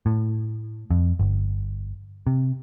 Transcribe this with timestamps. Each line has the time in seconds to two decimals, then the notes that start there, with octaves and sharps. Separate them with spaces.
0.06 A2
0.91 F2
1.19 G1
2.27 C3